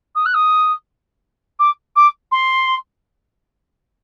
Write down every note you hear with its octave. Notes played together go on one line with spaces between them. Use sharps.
D#6
F#6
D#6
D6
D6
C6